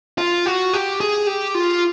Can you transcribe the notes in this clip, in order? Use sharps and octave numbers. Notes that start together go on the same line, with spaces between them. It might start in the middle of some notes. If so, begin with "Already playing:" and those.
F4
F#4
G4
G#4
G4
F4